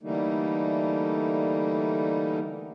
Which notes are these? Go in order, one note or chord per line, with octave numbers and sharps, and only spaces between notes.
D3 E3 G3 A3 A#3 D#4